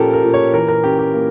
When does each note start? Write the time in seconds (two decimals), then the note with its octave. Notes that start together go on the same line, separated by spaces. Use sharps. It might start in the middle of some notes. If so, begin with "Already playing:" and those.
Already playing: A#2 F3 C#4 G4 A4 A#4
0.13 A#4
0.24 A#2
0.34 C#5
0.53 E3 A#4
0.68 A#4
0.84 C#4 G4
0.99 G4
1.13 A#3